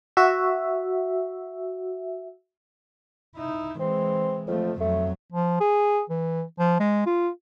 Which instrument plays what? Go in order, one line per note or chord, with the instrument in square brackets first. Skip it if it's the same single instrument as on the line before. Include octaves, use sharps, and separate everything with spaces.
[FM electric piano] F#4 E5
[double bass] D#4 E4
[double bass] E3 G#3 [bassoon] C4
[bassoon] F2 [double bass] F3 A3
[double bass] F2 F#3 [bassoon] A3
[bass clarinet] F3
G#4
E3
F3
G#3
F4